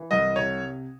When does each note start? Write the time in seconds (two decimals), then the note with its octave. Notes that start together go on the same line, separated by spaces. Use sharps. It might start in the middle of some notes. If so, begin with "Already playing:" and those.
Already playing: E3
0.11 C2 D#5
0.36 C3 C#5